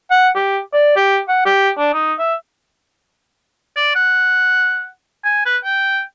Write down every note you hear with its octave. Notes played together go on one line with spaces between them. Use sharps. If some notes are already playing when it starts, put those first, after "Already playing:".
F#5
G4
D5
G4
F#5
G4
D4
D#4
E5
D5
F#5
G#5
B4
G5